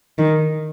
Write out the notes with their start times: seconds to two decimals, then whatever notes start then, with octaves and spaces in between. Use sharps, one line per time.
0.18 D#3